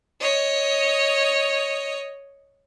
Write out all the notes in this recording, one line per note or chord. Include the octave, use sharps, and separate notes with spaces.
C#5 D#5